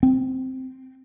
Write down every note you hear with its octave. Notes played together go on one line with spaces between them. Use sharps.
C4